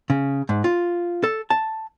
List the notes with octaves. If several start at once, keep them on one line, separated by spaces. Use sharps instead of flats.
C#3
G#2
F4
A4
A5